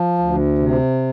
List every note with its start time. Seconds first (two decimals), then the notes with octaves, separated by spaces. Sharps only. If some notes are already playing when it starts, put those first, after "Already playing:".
Already playing: F3
0.18 D2
0.58 C3